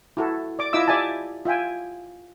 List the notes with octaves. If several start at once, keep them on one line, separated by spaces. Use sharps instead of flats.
E4 F#4 A4
D5 D6
E4 F4 D#5 E5 D6 E6
G4 D5 E5 G#5 A5
F4 E5 G5 G#5